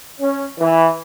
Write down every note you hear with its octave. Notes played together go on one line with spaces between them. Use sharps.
C#4
E3